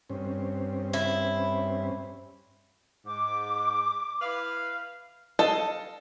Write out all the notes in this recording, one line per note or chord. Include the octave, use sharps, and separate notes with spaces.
G2 C4 C#4
E4
G#2 D6
E4 B4 F5
A4 D#5 F5 A5